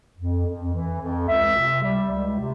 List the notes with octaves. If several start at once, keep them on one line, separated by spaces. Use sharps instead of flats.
F2
F2
E3
F2
C#2 E5
C3
G3
C#2
C3